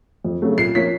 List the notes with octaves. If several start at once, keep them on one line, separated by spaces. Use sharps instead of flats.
F2
C#3 F#3 A3
A#2 C7
F3 A#3 C#4 B6